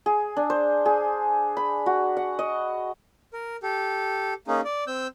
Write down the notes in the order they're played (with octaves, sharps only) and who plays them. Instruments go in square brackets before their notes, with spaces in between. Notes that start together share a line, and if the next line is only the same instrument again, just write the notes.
[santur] G#4
D4
C5
G#4
B5
F#4
F#5
D#5
[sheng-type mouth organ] A#4
G4 A4
A#3 C#4 D#4 G#4
D5
C4 E6 G6